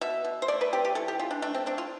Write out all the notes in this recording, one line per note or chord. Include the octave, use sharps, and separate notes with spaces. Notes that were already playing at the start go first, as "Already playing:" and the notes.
B2 E5
B2
C5
A3 D5
B4
C4 G4
G4
E3 A4
G4
E3 F4
D4
A3 D4
C4
C4 D4
F4